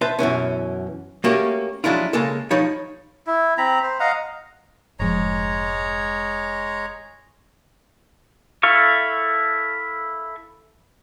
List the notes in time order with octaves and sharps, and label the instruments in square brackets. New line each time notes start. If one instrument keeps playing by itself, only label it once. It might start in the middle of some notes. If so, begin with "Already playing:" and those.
[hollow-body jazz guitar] B4 C5 E5 A5
F#2 B2 E3 C#4
A3 A#3 C#4 F#4 G4
F3 F#3 G#3 D4 E4 F4
C#3 G#3 A#3 A4
F3 D#4 C#5 B5
[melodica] E4
C4 A#5 B5
C5
D#5 F5 F#5 A#5
[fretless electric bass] F1 G#2 F3 [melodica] G#3 C#5 A#5
[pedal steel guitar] E4 A4 F5 C#6